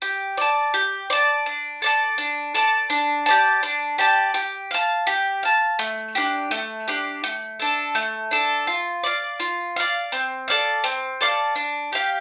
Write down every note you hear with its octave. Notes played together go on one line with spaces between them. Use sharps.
G4
D5 A5
G4
D5 A5
D4
A4 D5 A5
D4
A4 D5 A5
D4
G4 D5 A5
D4
G4 D5 A5
G4
F5 A5
G4
F5 A5
A3
D4 G4
A3
D4 G4
A3
D4 A4
A3
D4 A4
F4
D5 F5
F4
D5 F5
C4
A4 D5 F5
C4
A4 D5 F5
D4
G4 F5